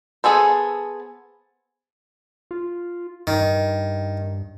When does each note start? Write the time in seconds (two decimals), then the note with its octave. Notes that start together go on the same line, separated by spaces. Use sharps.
0.24 B3 G#4 A4 C5
2.51 F4
3.27 G2 D#3